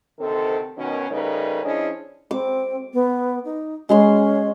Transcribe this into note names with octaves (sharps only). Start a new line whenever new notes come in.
D2 C3 D#3 C4 A4
B2 D#3 C#4
C#3 G3 A3 D#4 A#4 B4
F3 C#4 D4 E4 G#4 D#5
C4 D6
B3
D#4
G#3 C#4 G#4 C6